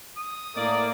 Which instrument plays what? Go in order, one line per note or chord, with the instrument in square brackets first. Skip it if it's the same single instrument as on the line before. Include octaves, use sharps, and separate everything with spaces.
[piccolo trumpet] D#6
[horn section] A2 D5 [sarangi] A#3